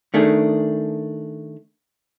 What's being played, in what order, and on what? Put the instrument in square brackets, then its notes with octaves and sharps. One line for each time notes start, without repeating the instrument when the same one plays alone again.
[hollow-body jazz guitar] D#3 A3 D4 G#4